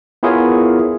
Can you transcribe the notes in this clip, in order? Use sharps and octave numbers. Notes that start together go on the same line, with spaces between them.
B3 E4 F4 G#4 A#4 C#5